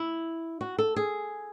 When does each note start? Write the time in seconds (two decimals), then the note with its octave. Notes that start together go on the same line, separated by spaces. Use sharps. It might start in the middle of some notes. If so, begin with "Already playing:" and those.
Already playing: E4
0.61 F#4
0.78 A4
0.96 G#4